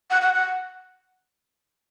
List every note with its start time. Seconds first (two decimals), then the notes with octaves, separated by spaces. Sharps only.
0.10 F#5
0.22 F#5
0.34 F#5